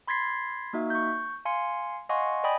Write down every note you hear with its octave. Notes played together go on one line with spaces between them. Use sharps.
B5 C6 G#6 A6 B6 C7
A#3 D#4 F#4 E5
C#6 G6
F5 G#5 C6 C#7
D#5 F5 F#5 G#5 C6 C#6
D5 D#5 G5 G#5 B5 D#6